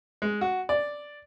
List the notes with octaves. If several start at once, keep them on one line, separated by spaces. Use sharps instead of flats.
G#3
F#4
D5